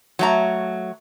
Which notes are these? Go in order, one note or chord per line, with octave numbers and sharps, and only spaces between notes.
F#3 A3 A#5